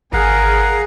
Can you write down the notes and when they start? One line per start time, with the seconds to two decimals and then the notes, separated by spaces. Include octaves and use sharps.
0.13 G#1 G#4 A#4 F5 F#5 A#5